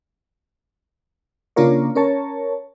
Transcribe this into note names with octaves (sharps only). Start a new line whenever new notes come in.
C#3 A#3 D4 F4 A#4 C#5
C#4 A#4 C#5 A5